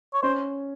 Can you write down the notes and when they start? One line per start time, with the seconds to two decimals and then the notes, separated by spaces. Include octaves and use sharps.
0.13 C#5
0.22 C#4 C5